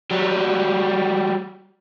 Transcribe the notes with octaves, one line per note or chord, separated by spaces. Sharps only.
F#3 G3